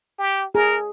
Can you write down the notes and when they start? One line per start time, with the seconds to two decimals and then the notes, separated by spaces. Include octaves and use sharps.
0.19 G4
0.55 G#4 A#4